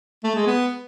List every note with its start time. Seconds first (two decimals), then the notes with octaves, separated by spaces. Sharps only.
0.24 A3
0.35 G#3
0.47 B3